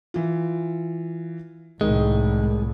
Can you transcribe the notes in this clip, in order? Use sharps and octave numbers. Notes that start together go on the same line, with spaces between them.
E3 F4
C2 A2 D#3 G#3